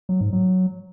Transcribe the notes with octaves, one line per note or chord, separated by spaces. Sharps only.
F#3
G#2
F#3